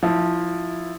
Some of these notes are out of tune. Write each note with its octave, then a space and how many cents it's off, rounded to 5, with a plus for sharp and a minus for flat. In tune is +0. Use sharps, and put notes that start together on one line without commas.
F3 +0 E4 -10